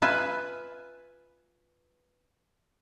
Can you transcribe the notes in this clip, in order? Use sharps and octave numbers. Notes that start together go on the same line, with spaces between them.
F4 B4 E5 G#5